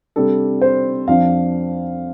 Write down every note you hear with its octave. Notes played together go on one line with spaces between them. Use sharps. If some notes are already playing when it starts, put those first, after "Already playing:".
C3 G3 D4 A4
C5
F2 F3 D4 F5